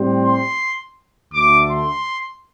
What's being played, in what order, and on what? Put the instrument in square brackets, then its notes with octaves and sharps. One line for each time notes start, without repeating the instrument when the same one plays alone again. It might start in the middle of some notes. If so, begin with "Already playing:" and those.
Already playing: [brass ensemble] A2 G3 C4 G4 C5
[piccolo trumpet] C6
[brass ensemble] D2 D3 A3 [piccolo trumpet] D6
[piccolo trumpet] C6